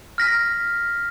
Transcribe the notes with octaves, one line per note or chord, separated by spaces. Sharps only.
F6 A#6 B6